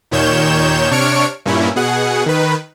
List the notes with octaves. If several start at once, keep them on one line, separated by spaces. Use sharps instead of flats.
D#2 A#2 D#3 C#5 G6 E7
C3 D4 C#5 C#6 F6 D7
G2 A#2 C#4 E4
B2 G#4 F#5
D#3 B4